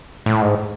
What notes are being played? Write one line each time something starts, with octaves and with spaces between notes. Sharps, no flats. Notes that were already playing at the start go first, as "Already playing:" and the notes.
A2
G#2